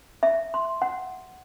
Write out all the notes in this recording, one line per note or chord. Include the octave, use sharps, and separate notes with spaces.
E5
C6
F#5